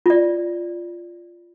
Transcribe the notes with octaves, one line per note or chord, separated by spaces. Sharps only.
F4 D5